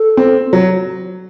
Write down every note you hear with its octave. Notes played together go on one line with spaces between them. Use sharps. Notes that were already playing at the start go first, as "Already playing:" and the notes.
Already playing: A4
C4
F#3